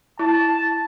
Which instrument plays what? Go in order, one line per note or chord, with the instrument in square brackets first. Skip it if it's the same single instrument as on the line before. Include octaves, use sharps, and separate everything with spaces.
[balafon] E4 [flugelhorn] A5